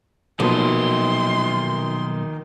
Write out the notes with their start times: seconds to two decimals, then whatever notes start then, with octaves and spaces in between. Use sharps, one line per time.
0.40 B1 A#2 D#3 F3 F#3 B4 C6